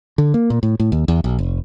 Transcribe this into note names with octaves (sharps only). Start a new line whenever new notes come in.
D3
A#3
A#2
A2
A2
D#2
E2
B1
F1